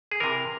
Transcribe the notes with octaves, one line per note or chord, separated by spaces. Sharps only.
G#4
C3 E3 A#4